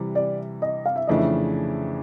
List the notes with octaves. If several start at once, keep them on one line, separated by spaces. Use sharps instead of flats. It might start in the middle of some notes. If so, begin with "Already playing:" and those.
Already playing: C3 E3 G3
D5
D#5
F5
E5
F2 C#3 E3 A3 D4 D#5
E5